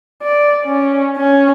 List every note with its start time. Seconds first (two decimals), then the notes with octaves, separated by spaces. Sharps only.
0.23 D5
0.64 C#4
1.16 C#4